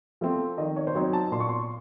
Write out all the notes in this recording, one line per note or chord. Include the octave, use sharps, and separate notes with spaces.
F3 A3 C4
D#3 D#5
C#5
C5
F#3 C4 D#4 C#5
A5
A#2 C6
C#6
C6